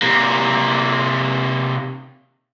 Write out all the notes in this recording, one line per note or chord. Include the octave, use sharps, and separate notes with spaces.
C3 A#3